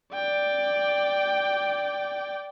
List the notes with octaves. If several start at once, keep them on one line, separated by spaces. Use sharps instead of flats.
D5 G5